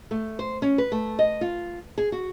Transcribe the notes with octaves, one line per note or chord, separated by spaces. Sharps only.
A3
C5
C#4
B4
A3
D#5
F4
G#4
F#4